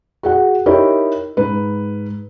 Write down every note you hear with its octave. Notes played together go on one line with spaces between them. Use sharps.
F#4 G#4 F#5
D#4 E4 G4 A#4 C#5
G#2 B4